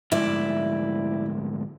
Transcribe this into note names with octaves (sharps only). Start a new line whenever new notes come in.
D2 G#2 E4 D5